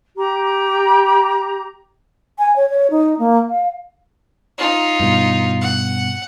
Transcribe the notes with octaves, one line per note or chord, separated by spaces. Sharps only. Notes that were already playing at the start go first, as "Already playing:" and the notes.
G4 A#5
G#5
C#5
C#5
D#4
A#3
F5
D#4 F4
G2 B2
F#5